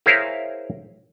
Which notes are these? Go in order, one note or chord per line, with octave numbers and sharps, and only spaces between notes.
E4 G#4 A#4 C5 C#5 F5